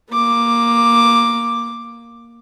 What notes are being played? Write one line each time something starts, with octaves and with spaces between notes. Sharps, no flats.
A#3 D6